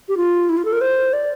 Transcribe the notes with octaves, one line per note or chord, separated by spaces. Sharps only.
G4
F4
E4
F4
A4
A#4
C5
D5